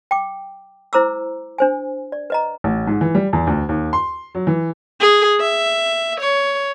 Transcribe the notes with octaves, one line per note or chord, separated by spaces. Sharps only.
G5 D6
E4 C5 A#5 D6 E6
D4 C5 G#5
D5
B4 D#5 A#5
A1
G#2
E3
G3
E2
D2
D#2
C6
F#3
E3
G#4
E5
C#5